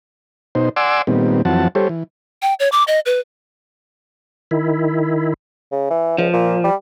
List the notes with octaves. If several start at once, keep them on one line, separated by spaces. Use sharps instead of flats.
B2 D#4 C5
D5 F#5 G#5 C6 D6 E6
A#2 D#3 G3 B3 C4
F2 E3 F#3 C4 F#5 A5
G3 G4 A4 C5 C#5
E3
G5
C#5
D6
D#5
B4
D#3 E4
C#3
E3
C#2 F3
A#2
G3